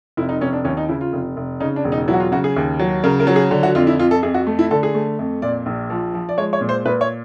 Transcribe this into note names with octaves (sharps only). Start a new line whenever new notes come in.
F1 E4
D#4
F1 C#4
D4
D#2 C#4
D#4
C#3 E4
F4
F1
F1
C#3 D#4
D4
E1
D#4
F#3 E4
F#4
F4
C#3 F#4
G#4
D#2
F#3
C#3 A#4
A#4
F#3
G#4
D3
F#4
F2 F4
E4
F2 F4
A4
F2 G#4
F#4
A3
E4
D3 A4
G#4
A3
F2
A#2 D5
A#1
F3
F3
D5
G#3 C#5
C#5
A#2
C5
A#2 B4
C#5